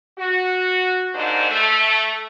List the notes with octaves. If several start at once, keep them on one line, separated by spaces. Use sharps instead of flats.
F#4
D#2 G#2 D4 D#4 C5
A3